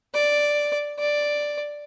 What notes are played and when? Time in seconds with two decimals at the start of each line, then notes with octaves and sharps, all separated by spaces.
0.14 D5
1.00 D5